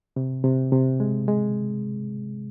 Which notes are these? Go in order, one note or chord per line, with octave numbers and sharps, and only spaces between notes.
C3
C3
C3
G#3
G#3